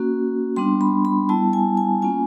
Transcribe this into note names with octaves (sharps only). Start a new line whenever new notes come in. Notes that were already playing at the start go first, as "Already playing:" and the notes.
Already playing: A#3 C#4 F#4
G3 B3 D4 C6
B5
B5
G3 B3 E4 A5
G#5
G#5
A#3 C#4 F4 G#5